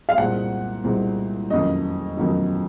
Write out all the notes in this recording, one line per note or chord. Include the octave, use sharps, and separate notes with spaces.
F5
C2 A#2 G#3 C4 F#5
C2 A#2 G#3 C4
F2 D#3 F#3 A#3 C#4 D#5
F2 D#3 F#3 A#3 C#4